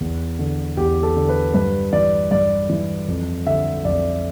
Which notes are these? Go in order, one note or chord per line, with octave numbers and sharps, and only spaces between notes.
E2
D3
E2 G4
A4
D3
B4
G2 B4
E3 D5
G2 D5
E3
F2
D3 E5
F2 D5